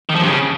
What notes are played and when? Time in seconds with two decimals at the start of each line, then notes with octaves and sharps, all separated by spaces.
0.09 D#3
0.15 F3
0.21 G2
0.27 C#3